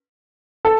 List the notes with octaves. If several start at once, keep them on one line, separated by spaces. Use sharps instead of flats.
A4